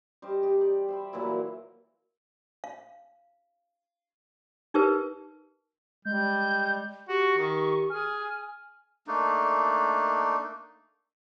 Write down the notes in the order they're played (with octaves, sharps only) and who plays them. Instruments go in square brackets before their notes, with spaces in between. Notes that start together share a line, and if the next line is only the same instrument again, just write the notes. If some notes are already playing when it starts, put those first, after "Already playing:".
[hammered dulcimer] G3 G4 C5 D#5
D#4 G4 D5
D5
C5 E5 B5
A#2 E3 F#3 E4
[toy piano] F5
D#4 G4 A#4 B4
[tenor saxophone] G3 [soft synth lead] G#3 [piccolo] G6
[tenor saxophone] F#4 [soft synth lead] G4 [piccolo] C#6
[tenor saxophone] D#3
[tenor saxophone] G#4 [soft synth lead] G#5 [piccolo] F6
[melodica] A3 A#3 D4 D#4